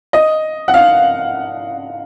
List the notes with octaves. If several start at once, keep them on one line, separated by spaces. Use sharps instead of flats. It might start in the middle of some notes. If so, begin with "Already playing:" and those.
D#5
F#5
F5